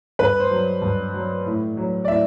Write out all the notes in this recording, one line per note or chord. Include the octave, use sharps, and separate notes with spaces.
G2 B4
C5
F#3
G2
F#3
A2
F#3
D5
A2 E5